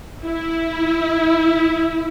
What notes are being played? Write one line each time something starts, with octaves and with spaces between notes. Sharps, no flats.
E4